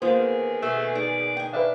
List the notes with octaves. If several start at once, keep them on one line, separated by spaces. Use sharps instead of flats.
D3 D#3 A#3 B3 F4 G#4 C5
B2 A3
D#4 D5
D#4 G5 G#5
D4 B4 E5 F5